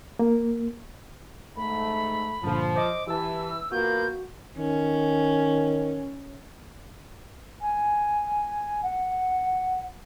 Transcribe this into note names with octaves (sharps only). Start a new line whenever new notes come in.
A#3
G#2 A3 B5
G2 A#2 D3 F3
C5 D#5 D6
E3 G4 A5 E6
A#3 B3 F4 F#4 G6
D#3 C#4
G#5
F#5